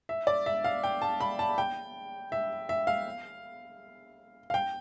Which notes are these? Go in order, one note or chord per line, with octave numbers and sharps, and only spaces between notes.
E5
D5
E5
F5
G5
A5
B5
A5
G5
E5
E5
F5
F5
G5